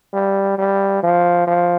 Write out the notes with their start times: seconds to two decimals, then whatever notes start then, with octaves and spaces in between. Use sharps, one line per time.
0.13 G3
0.58 G3
1.03 F3
1.47 F3